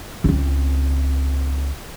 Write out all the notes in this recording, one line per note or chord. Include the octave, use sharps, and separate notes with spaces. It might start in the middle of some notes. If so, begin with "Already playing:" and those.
C#2 C4